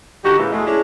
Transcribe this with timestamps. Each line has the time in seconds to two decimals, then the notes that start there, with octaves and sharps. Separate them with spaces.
0.24 D3 D#4 F#4 G4
0.38 A#2 C#3 E3 G#3 A#3
0.52 E2 B2 G#3 A3 D#5
0.65 G#3 C#4 D4 E4 G#4